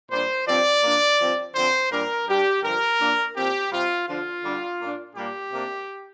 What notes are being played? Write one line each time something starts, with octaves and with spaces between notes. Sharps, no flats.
A#2 G3 D4 C5
G2 F3 C4 D5
A#2 A#3 D4
G2 F3 C4
D3 F3 C4 C5
A#2 G3 D4 A#4
G2 G3 D4 G4
G2 D3 F3 A#4
A#2 A#3 D4
A#2 F3 C4 G4
C3 G3 C4 F4
D3 F3 D4 F4
D3 G3 D4
A#2 A#3 D4
A#2 G3 A#3 D4 G4
C3 A#3 D4